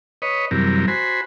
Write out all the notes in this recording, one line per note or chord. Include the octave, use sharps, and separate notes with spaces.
B4 C#5 D#5
F#2 C3 E3 G3 A#4
F#4 C5 G#5 B5